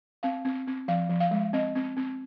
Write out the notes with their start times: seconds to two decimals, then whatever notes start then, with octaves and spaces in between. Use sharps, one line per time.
0.23 C4 F5
0.45 C4
0.67 C4
0.88 F3 F5
1.09 F3
1.20 F5
1.31 G#3
1.53 C4 D#5
1.75 C4
1.97 C4